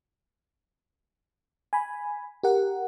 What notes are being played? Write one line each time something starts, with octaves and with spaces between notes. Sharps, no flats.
G#5 B5
G4 A#4 F#5